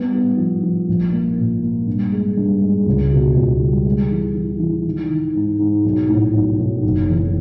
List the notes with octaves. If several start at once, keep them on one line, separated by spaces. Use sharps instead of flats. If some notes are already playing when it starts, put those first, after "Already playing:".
Already playing: G3 B3
B3
F3
F3
A#1
A#3
A#2
A#3
G2
G#3
G2
G#3
C#2
B2
C#2
G3
G#3
E3
E3
E3
D#3
D#3
G#2
G#2
B1
A2
B1
B1
F#1
E2